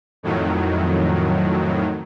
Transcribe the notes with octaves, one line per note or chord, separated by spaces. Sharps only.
F2 A2 D#3 F#3